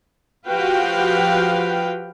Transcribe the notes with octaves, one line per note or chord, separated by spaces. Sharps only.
F3 F#4 G4 B4 F5 G5